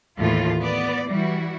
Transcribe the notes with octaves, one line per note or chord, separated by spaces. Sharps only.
D#2 A2 E3 F4
B3 D5
E3 G3 E4 F#4